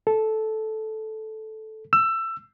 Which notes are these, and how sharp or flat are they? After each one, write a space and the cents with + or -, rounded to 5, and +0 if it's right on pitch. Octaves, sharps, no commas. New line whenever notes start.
A4 -10
E6 +20